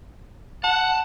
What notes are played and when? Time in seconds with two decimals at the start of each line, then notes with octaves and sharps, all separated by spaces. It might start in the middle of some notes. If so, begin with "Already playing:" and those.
0.64 F#5 A5